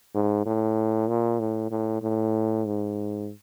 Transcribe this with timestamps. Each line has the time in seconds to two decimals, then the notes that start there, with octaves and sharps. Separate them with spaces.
0.15 G#2
0.46 A2
1.08 A#2
1.40 A2
1.71 A2
2.02 A2
2.65 G#2